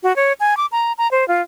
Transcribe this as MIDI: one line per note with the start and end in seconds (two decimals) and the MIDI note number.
0.03 0.15 66
0.16 0.33 73
0.40 0.57 80
0.57 0.66 86
0.72 0.93 82
0.98 1.10 82
1.11 1.27 72
1.28 1.42 65